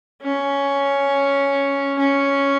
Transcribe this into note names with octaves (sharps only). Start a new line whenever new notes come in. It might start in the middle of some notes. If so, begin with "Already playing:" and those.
C#4
C#4